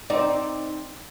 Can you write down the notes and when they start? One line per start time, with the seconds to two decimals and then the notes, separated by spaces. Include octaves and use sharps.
0.10 C4 D#4 D5